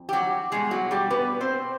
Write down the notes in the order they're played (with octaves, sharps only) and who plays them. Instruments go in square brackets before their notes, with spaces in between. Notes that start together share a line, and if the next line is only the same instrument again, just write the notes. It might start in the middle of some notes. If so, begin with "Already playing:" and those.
Already playing: [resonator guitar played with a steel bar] F2
G4
F#3 F#4
B2 G3 G#3 G#4
F#3 F#4
G3 G4
B3 B4
C4 C5